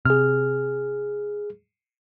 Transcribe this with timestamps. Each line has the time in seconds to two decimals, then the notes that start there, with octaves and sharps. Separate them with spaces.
0.05 C3 G#4 F6